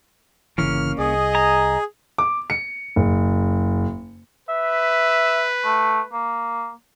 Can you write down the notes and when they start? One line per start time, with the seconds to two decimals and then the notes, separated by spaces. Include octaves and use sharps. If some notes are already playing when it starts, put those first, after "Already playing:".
0.58 G1 C#3 E3 A#3 C#4 F6
0.99 C2 G#4 D#5
1.35 G#5 A#5
2.18 D6
2.50 C#7
2.96 F#1
4.49 B4 E5
5.64 A3
6.13 A#3